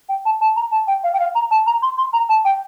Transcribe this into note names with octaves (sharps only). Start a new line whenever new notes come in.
G5
A5
A5
A#5
A5
G5
F5
G5
F5
A#5
A5
A#5
C6
C6
A#5
A5
G5